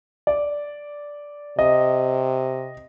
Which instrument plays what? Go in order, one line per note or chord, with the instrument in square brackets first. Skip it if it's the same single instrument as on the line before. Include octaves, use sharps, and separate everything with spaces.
[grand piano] D5
[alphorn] C3 [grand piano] D#5